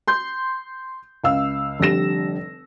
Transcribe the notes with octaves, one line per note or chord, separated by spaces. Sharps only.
C6 G6
C#2 F5 E6
F1 D3 G3 A#6 E7